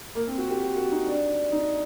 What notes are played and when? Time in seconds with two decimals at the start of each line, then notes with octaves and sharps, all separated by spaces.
0.15 A#3
0.27 C4
0.38 F#4
0.50 G4
0.62 F#4
0.77 F#4
0.91 D#4
1.06 D4
1.52 D#4